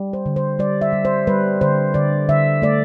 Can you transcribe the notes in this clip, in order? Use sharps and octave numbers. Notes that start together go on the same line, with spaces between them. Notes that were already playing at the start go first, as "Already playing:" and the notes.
Already playing: G3
C5
D3
C5
G3 D5
E5
G3
C5
G3 B4
D3 C5
D3 D5
D3 E5
A3 D5